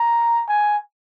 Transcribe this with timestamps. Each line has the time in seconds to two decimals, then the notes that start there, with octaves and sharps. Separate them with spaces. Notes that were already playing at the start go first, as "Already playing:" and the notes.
Already playing: A#5
0.48 G#5